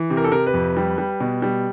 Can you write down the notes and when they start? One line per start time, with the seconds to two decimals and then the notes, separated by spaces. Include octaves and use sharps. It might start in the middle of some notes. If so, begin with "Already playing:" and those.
Already playing: E3
0.10 C3
0.17 A#4
0.24 A4
0.32 C3 A#4
0.46 B4
0.54 F2
0.77 G3
0.98 G3
1.20 B2
1.42 G3